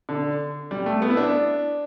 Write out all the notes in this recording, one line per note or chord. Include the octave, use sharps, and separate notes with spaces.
D3
G3
A3
B3
E4
D4